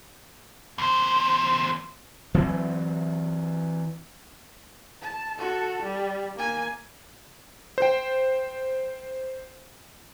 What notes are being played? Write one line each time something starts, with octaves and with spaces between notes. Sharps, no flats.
E2 C5
E3 F#3 C4
A5
F#4 A4
G3
A#3 G#5
C5 G5